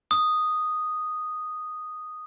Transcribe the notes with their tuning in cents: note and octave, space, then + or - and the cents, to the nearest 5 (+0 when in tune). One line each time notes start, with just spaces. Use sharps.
D#6 -5